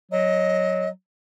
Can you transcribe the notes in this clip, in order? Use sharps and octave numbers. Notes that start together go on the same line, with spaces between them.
F#3 D#5